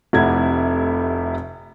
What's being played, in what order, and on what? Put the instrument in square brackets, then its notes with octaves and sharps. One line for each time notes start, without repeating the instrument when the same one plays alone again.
[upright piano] F1 C3 A3 E4 F#5 G#6